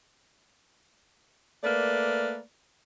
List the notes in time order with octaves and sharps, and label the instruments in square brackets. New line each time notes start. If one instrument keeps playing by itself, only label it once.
[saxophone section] A3 A#3 B4 D5